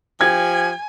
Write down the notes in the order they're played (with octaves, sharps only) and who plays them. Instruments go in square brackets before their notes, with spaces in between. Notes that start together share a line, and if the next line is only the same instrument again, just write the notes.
[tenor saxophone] F3 [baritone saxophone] G4 [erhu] G#5 [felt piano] G#6